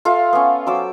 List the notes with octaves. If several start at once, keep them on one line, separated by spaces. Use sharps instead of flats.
F4 A4 E5 F5
B3 C#4
F#3 C5 D6 E6